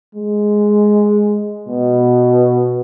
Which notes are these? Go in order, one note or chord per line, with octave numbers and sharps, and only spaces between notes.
G#3
B2